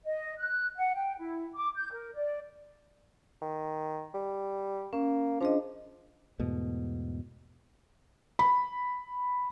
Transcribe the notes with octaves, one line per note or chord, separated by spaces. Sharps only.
D#5
F#6
F#5
G5
E4
D6
G6
A#4
D5
D#3
G3
A#3 C#4
F3 D4 G#4 D#5
E2 G#2 B2 A3
B5